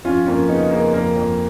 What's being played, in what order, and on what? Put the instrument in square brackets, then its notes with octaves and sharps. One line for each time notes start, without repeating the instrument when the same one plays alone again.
[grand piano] F2 C#4 F4
F2 A#3 C#4
C#3 B3 D#4
C#3 A#3
F2 A#3
F2